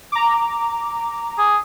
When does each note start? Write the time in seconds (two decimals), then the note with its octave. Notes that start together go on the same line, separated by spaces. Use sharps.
0.12 A#5 D6
1.38 G#4